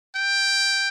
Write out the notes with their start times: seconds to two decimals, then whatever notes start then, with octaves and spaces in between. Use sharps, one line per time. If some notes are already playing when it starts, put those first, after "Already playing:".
0.15 G5